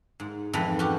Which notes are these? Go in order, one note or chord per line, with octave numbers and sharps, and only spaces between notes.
G#2
F2 G#2 E3 A4 A#5 B5
C#4 F#4 G4